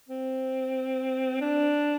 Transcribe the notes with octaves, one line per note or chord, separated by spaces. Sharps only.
C4
D4